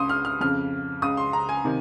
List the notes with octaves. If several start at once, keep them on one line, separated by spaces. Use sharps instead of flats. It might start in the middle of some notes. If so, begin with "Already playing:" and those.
Already playing: C#2 C#3 C6 D#6
F6
F6
F2 C#3 F6
C#2 C#3 D#6
C6
A#5
G#5
C3 D#3